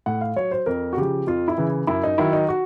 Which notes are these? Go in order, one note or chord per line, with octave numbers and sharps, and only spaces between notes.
A2 F#5
F5
F#3 C#5
C5
F2 A#4
F#4
C#3 F3 G4
F2 F4
E4
C#3 E3
F#2 E4
D#4
D#3 F#3 E4
D#4
F#4